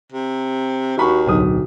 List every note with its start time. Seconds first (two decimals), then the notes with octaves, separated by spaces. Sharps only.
0.13 C3
0.97 D#2 F#4 B5 C#6
1.26 D1 B1 D#6